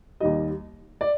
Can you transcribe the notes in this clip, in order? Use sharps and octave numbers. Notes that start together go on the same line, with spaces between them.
D#2 D#3 G3 D#5
D5